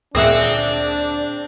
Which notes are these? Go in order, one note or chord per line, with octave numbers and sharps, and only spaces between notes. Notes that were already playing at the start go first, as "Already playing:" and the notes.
D2 A#2 C4 D4 G#4 D#5 E5 F#5